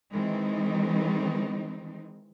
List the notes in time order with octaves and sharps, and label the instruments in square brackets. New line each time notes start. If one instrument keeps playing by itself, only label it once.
[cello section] D#3 E3 G#3 C4 D#4